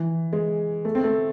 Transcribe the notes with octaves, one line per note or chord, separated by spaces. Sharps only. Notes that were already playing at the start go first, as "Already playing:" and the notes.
Already playing: E3
G#3
A3
C4
A3